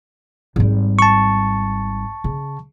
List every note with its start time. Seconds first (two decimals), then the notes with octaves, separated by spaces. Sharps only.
0.56 G#1 G3
0.99 A5 C#6
2.24 C#3